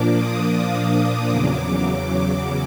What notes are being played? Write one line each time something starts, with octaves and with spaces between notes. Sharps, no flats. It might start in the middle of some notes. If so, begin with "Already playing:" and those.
Already playing: A#2 F3 A#3 D4 D6
D#6
D6
E2 C#3 F#3 D6